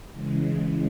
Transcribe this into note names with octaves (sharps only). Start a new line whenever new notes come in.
C#3 E3 G#3